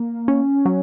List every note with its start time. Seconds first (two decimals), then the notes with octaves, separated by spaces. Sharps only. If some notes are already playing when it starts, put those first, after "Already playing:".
Already playing: A#3
0.28 C#4
0.66 F#3